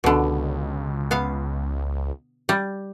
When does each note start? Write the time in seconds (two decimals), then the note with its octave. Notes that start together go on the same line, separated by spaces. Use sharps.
0.04 C#2 B2 D3
1.11 B3 F5
2.49 G3